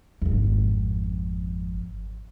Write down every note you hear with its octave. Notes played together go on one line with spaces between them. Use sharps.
G#1 F2